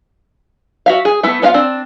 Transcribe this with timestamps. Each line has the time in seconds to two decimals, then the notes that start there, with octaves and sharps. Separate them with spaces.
0.86 F#4 E5 F5
1.05 G#4
1.23 A3 B3 E4
1.42 B3 D4 F4 F5
1.54 C4 D4